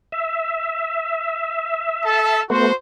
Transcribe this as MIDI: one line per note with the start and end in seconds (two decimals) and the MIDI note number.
0.12 2.43 76
2.05 2.43 69
2.05 2.43 81
2.50 2.73 57
2.50 2.73 59
2.50 2.73 66
2.50 2.73 72